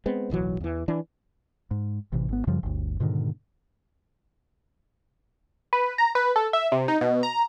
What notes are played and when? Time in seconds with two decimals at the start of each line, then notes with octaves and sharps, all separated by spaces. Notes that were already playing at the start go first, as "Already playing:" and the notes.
0.06 G#3 B3 C4
0.30 D1 B1 E3 F#3
0.60 E2 E3
0.88 E3 D4
1.71 G#2
2.12 A1 C3 E3
2.29 G#1 B3
2.47 F#2 C#3 F3 G3
2.63 G1 D2
3.00 G#2 B2 D3 D#3
5.73 B4
5.98 A#5
6.15 B4
6.36 A4
6.53 E5
6.72 C3
6.88 D#4
7.01 B2
7.23 A#5